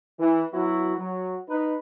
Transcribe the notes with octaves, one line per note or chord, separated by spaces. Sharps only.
E3
F#3 B3 E4 F#4
F#3
D#4 B4